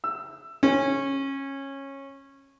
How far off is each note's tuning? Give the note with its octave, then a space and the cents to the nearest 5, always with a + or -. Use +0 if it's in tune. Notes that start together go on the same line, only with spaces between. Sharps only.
E6 +15
C#4 -20